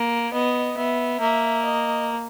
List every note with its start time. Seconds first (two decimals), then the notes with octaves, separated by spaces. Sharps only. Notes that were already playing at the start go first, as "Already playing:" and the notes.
Already playing: A#3
0.33 B3 D#5
0.77 B3 E5
1.21 A#3 E5
1.65 D#5